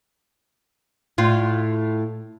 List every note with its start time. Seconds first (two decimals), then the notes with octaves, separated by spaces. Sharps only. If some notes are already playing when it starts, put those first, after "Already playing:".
1.18 A2 F4